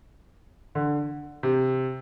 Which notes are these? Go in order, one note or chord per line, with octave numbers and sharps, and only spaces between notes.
D3
C3